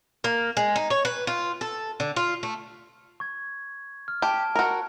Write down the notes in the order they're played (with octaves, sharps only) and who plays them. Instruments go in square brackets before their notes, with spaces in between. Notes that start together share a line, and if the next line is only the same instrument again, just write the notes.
[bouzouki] A#3
G#3
D#4
C#5
B4
F4
A4
D3
F4
A3
[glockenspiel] C#6 G#6
F6
[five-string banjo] G4 [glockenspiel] A5 D7
[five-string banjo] F#4 A#4